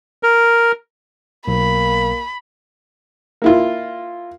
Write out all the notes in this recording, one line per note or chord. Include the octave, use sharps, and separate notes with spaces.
A#4
B1 A#3 B5
A#3 E4 F4